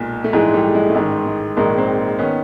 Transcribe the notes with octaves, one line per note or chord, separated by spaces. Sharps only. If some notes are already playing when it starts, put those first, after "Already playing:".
Already playing: B1 A#2 G#3
A3
A#1 G#2 E3 G#3
G3 A3
G#3
A3
A1 G#2 D#3 G#3
G#3
A#1 G#2 D#3 G#3 A#3
A#3 C4
D#3 B3 C#4